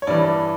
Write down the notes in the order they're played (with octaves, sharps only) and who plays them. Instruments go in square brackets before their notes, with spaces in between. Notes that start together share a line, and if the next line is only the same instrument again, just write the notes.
[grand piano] C#5
G2 E3 D5